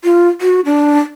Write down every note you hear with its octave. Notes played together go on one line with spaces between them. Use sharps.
F4
F#4
D4